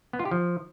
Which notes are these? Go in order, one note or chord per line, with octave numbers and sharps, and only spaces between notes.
B3
F4
G4
F3